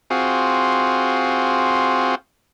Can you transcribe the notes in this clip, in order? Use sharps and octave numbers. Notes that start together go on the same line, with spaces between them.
C4 F4 F#4 G#4